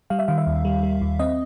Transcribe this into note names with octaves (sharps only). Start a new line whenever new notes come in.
G3 F5
E5
D#3 F5
E5
D#2
G3
G3
D#2
C4 D#5